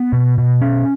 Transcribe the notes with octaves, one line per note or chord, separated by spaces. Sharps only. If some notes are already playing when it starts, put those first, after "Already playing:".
Already playing: B3
B2
B2
C#4